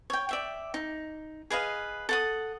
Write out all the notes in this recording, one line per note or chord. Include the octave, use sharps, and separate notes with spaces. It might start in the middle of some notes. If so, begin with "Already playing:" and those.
C#5 G5
D5 E5 G5
D#4
G#4 B4 D#5 F5
A4 F#5 D#6